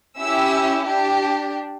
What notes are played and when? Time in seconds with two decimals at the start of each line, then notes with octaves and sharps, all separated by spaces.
0.20 C#4 E4 G4 E5 E6
0.87 D4 G4